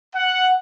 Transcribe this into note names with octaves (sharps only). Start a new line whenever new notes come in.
F#5